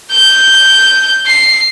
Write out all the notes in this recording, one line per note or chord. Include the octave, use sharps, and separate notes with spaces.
G6
C7